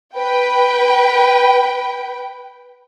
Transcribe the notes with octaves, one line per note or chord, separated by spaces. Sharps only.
B4 G5